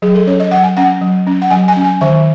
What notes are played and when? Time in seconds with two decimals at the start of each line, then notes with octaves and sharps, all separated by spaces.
0.02 F#3 G#4
0.15 A4
0.27 C#4 C#5
0.40 D#5
0.51 F#3 F#5
0.63 G#5
0.77 C#4 F#5
1.01 F#3
1.27 C#4
1.42 F#5
1.51 F#3 G#5
1.68 G#5
1.76 C#4
1.84 G#5
2.01 D#3 E5